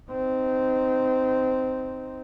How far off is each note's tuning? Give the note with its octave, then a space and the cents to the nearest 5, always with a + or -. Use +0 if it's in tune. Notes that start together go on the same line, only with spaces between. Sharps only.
C4 -15 D#4 +0